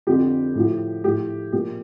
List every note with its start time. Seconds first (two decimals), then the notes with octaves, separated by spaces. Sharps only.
0.07 F2 D3 F3 G4
0.55 A2 F3
1.04 A2 F3 G4
1.53 A#2 F3 G4